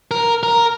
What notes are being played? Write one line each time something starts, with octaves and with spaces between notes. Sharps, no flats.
A#4
A#4